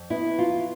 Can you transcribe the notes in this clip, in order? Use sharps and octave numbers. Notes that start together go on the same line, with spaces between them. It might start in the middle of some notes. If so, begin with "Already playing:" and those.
Already playing: F2
B3 E4
F#3 F4